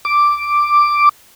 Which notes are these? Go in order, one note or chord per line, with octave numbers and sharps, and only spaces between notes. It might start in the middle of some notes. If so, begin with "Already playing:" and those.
D6